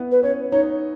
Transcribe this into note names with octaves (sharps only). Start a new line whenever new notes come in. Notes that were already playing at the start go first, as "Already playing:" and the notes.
Already playing: B3 E4
B4
C#4 C#5
D#4 C#5